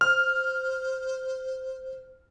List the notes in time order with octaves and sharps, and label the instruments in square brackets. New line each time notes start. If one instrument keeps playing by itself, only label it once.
[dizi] C5 [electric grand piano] F6